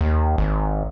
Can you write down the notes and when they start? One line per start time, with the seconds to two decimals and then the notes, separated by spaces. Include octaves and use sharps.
0.01 D#2
0.38 G#1